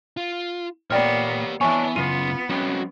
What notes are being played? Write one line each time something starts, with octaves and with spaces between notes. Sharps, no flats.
F4
A#2 A#3 B3 G4 C#5 D5 G5 F6
E3 B3 C#5 D5 G#5 A5 C#6
F#2 C#3 B3 F4 D#7
F#3 C4 C#4 F#4 G5